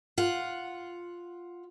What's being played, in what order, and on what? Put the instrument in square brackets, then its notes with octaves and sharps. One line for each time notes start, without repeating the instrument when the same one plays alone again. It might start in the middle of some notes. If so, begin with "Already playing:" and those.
[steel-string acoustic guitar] F4 F#5